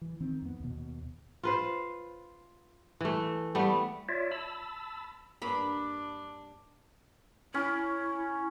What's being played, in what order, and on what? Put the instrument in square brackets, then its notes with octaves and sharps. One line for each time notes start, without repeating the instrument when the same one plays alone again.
[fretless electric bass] E3
D#3 C4
F2 B3
D#2 B2
[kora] F4 B4 C5
E3 A3
G3 A3 B3
[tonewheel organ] F4 C#5 D5 E5
A5 B5 E6
[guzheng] G2 A#3 [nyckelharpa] D4 [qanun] B5
[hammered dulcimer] C#4 [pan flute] E4